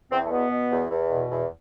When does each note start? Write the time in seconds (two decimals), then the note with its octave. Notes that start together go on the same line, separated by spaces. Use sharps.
0.11 E2 C4
0.26 A3
0.31 B2 B3
0.51 B2
0.71 E2
0.90 E2
1.10 B2
1.30 E2